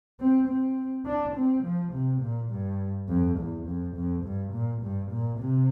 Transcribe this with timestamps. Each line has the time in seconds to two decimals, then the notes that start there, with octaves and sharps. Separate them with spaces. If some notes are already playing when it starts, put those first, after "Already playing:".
0.20 C4
0.48 C4
1.06 D4
1.36 C4
1.64 F3
1.93 C3
2.22 A#2
2.50 G2
3.09 F2
3.38 E2
3.66 F2
3.95 F2
4.25 G2
4.53 A#2
4.82 G2
5.12 A#2
5.39 C3